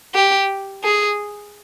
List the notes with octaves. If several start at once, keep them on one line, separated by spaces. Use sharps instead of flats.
G4
G#4